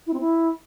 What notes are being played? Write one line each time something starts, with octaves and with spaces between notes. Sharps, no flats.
E4
C4
E4